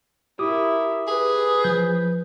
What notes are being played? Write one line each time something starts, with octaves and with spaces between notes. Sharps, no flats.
E4 G4 A#4 D6 D#6
G#4 B4
F3 G6